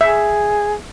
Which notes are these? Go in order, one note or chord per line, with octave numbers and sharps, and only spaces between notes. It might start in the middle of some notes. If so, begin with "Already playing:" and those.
G#4 E5